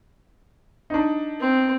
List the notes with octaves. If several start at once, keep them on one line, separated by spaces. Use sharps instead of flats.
D4 D#4
C4